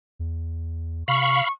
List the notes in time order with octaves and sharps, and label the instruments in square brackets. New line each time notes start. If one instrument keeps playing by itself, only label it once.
[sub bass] E2
[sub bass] C3 [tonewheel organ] F5 B5 [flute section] C#6